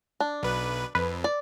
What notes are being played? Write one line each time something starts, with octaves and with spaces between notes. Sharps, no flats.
D4
B1 B4
F2 B4
D5